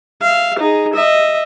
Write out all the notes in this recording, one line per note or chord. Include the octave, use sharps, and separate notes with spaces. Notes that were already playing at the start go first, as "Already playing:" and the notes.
E5 F5
D#4 G#4
D#5 E5